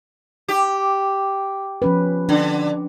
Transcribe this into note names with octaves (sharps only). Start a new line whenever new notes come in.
G4
F3 C#4 B4
D3 D4